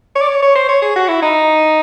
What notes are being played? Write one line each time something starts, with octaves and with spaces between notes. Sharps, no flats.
C#5
D5
C#5
C#5
C5
C#5
G#4
F#4
E4
D#4